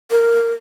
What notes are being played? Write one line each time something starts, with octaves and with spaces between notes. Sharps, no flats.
A#4